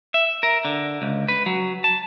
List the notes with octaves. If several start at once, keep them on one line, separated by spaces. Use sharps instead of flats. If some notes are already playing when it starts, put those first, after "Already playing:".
E5
A#4
D3
C#2
B4
F#3
A5